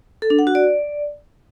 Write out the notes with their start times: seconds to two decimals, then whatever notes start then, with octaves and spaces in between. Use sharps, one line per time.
0.22 A4
0.30 D4
0.39 F#5
0.47 F#4
0.55 D5